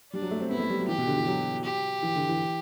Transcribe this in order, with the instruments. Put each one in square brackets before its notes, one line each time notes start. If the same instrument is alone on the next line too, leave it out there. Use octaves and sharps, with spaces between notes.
[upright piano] G3 [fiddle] D4
[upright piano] F#3
A3
C4
[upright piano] B3 [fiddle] E4
[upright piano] A3
G3
F#3
[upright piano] E3 [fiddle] G4
[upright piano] B2
D3
E3
F#3
[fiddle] G4
[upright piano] E3
D3
E3